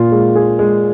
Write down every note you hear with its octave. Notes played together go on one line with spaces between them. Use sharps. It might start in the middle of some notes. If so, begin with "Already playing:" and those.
Already playing: A#2 F4
G#3
G#4
G#3